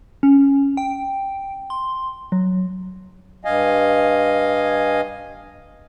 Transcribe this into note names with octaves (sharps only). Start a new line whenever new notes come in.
C#4
G5
C6
F#3
G2 D#5 F5 G#5